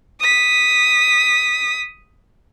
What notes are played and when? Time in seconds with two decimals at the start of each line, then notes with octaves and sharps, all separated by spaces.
0.20 D#6 B6